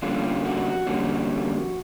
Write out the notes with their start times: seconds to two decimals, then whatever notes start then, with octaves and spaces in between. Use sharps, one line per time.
0.02 F2 D3 G3 A#3 C#4 F4
0.45 F#4
0.87 F2 D3 G3 A#3 C#4